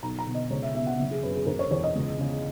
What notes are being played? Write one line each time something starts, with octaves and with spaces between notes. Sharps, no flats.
B1 A#5
A#5
B2
D#5
C#2 C#5
E5
B2 E5
F#5
F#1 E5
G#4
F#2 B4
G#4
E1 A#4
C#5
E2 C#5
D#5
C#2
C#3